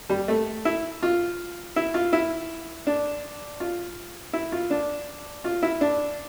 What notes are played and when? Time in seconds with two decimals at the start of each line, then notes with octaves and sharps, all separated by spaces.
0.10 G3
0.28 A3
0.65 E4
1.03 F4
1.76 E4
1.94 F4
2.13 E4
2.87 D4
3.60 F4
4.33 E4
4.52 F4
4.70 D4
5.44 F4
5.63 E4
5.81 D4